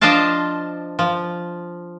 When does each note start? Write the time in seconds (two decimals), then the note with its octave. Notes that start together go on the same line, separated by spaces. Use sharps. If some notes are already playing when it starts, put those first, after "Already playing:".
0.01 F3 D4 C5 D#5 F5 A5
0.99 F3